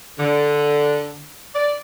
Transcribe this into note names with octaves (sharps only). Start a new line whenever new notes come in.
D3
D5